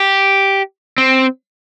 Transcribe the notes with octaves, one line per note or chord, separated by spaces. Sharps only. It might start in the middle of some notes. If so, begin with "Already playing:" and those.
Already playing: G4
C4